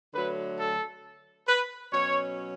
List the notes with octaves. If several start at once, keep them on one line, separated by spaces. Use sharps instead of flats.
D3 F#3 A3 B4
A4
B4
B2 F#3 C#4 C#5